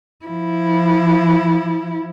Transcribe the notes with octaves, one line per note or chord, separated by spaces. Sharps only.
F3 E4